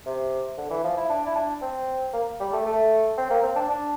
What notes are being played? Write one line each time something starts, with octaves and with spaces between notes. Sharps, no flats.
C3
D3
E3
F3
E4
D4
E4
D4
C4
A#3
G3
A3
A3
C4
A#3
C4
D4
D4